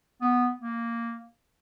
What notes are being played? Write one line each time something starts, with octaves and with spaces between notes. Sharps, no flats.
B3
A#3